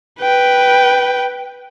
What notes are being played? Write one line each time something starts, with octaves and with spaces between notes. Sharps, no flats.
B4 G5